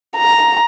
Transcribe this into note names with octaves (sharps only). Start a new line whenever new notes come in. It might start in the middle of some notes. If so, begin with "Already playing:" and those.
A#5